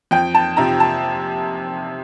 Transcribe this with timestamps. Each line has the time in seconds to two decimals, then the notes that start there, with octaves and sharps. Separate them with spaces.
0.11 F2 G5
0.34 A5
0.57 C3 F3 A#5
0.80 A5